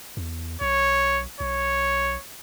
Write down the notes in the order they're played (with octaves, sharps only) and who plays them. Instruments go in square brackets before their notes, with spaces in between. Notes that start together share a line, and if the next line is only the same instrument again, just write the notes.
[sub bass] E2
[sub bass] B1 [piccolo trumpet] C#5
[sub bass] B1 [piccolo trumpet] C#5